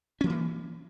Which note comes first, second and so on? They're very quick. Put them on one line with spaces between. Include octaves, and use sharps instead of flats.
C#4 F3 A#3 E3